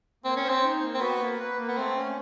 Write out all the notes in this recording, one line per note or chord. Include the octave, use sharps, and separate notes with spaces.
A#3 C4
C#4
C5
C4
D#4
A#3
C4
B3 F#4
A#3
B4
A#3
B3
A3 C4
C#4